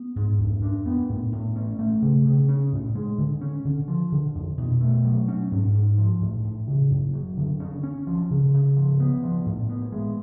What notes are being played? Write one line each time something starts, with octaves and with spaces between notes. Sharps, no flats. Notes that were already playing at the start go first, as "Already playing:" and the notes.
Already playing: B3
G#2
F2
D4
B3
A2
A2
C#4
A3
C#3
C#3
C#4
A2
G#3
D3
C#4
D3
F3
D3
F2
B2
A3
F#3
C#4
G#2
G#2
F3
A2
A2
C#3
F#2
F#3
D3
C#4
C#4
F3
C#3
C#3
F3
B3
F3
A2
B3
G#3